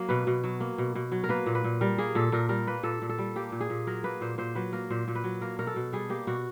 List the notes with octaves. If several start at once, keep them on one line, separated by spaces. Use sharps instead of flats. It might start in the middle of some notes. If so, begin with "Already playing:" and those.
Already playing: F#3 A#3
B2 B4
B2
F#3
A#3
B2
B2
F#3
A#4
A#3 B4
A#2
B4
A#2
G3 A#4
A#3 G#4
A#2 A4
A#2 A#4
G3 A#4
A#3 B4
A#2 A4
A#2
A4
G3
A#3 G4
A#2
G#4
A#2
F#3 A#4
A#3 B4
A#2 C5
A#2 C5
F#3 B4
A#3 A#4
A#2 C5
A#2
B4
F#3
A#3 A#4
B2 A#4
A4
B2
G3 G#4
A#3 G4
B2 F#4